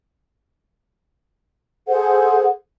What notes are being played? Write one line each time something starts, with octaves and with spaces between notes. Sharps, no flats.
G#4 A4 C5 F#5